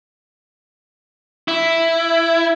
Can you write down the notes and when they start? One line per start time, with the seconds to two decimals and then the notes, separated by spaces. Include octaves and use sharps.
1.48 E4